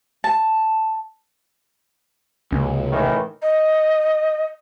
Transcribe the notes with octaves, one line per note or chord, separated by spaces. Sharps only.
A5
C#2 C3 A#3 C#4
A2 D#3 E3
D#5